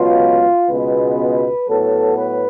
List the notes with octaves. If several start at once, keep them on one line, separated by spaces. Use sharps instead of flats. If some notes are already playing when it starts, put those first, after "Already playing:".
Already playing: C#2 B2 F#3 B3 F4
C#2 B2 G#3 B3 B4
A2 F#3 B3 A4
B4